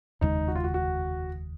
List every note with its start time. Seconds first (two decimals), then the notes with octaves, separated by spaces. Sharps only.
0.21 F1 D#2 C#3 G#3 D#4
0.48 F#4
0.55 F4
0.64 F#4
0.74 F#4